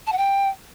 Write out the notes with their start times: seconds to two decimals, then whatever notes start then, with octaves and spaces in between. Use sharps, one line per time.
0.07 A5
0.12 F#5
0.18 G5